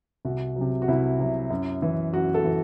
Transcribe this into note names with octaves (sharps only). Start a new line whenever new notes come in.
C2 F#4
C3 F#3
F#4
C2 E4
C3 F#3
F#2
E3
F#2 F#4
A4
E3